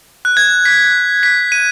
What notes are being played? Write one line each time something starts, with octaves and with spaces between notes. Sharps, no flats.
F#6
G#6
B6
B6
D#7